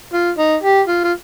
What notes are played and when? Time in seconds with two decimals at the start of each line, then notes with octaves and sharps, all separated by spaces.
0.13 F4
0.38 D#4
0.63 G4
0.87 F4
1.04 F4